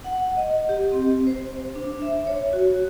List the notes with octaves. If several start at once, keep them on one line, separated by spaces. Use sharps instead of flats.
F#5
D#5
G4
C4
C5
D4
E5
C#5
F#4